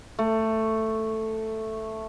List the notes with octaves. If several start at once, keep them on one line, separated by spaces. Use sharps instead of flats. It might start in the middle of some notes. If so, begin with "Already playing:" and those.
A3